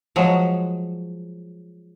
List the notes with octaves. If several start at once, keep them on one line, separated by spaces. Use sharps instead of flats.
F3 F#3 G#3 F#4